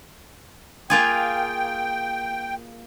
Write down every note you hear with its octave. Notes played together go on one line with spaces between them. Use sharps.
A#3 F4 G#4 G5